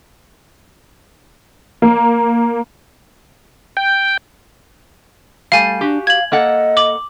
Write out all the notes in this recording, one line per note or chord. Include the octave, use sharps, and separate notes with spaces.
A#3
G5
G3 A3 F5 G#5
D4 F#4 G4
F5 G#6 F#7
A#3 A4 D#5 F#5
D6 F#7